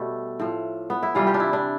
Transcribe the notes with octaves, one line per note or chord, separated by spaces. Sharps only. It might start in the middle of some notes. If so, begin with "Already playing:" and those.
Already playing: B2 G3 A3
A2 F3
B3
E4
C3 E3 G3 F4
G4
D4
E4
D4